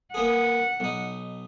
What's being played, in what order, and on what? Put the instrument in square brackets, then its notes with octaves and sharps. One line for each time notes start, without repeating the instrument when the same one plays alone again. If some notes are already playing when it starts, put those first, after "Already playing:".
[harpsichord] A#3 B3 G#4 [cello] F#5
[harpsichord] B1 D#4